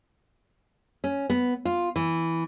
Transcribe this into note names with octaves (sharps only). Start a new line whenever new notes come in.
C#4
B3
F4
E3